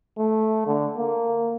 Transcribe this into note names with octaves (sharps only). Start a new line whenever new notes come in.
A3
D3
A#3